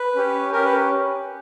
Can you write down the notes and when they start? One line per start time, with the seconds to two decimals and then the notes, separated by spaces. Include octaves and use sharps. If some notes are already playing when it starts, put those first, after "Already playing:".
Already playing: B4
0.15 C#4 G4
0.52 C#4 G4 A#4
0.64 B4